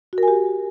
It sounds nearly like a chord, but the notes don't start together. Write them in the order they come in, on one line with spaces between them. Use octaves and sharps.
F#4 A#4 G#5 G4